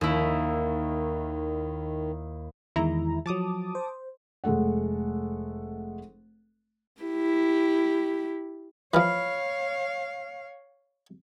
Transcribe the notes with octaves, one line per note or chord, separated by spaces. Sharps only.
D#2 D#3 E4
E2 D#3 G#3 E4 A#5
F3 F#3 A5 D6 D#6
C5
F1 G#3 A3 A4 F#5
E4 G4
E3 F3 C#5 F5 B5 F6